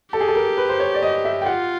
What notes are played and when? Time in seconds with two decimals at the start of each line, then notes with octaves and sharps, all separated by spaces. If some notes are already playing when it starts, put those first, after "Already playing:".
0.12 G4 A4
0.20 G#4
0.28 A4
0.35 A#4
0.58 B4
0.69 C5
0.80 C#5
0.94 D5
1.02 D#5
1.25 E5
1.41 G5
1.46 F4 F#5